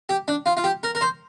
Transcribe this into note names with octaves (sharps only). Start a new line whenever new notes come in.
G4
D4
F4
F4
G4
A#4
A#4
C5